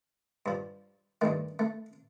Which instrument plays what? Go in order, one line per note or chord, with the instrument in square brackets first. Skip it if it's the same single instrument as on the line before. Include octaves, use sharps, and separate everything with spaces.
[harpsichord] G2 F3
G2 D#3 A3
A3